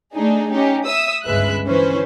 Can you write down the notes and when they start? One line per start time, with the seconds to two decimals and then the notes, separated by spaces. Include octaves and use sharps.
0.13 A3 D4 D#4 G#4
0.52 C#4 D#4 G4
0.87 E5 D#6 E6
1.24 G1 C#2 G#3 B4 E5 F#6
1.67 D3 E3 C#4 B4 C5